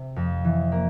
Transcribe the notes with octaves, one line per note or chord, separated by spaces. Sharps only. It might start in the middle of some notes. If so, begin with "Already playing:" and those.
Already playing: C3
F2
E3
A#3